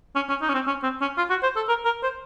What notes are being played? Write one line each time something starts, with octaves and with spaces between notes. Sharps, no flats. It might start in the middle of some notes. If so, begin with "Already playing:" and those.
C#4
C#4
D#4
C#4
C4
C#4
C4
C#4
F4
F#4
C5
A4
A#4
A#4
C5